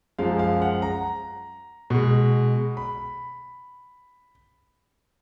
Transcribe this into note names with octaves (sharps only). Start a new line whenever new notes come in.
F#2 F3 G#3 F5
F5
F#5
A#5
B2 G#3
B5